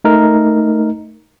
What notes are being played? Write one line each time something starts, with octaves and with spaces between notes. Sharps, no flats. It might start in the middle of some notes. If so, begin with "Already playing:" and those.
A3 D#4 A#4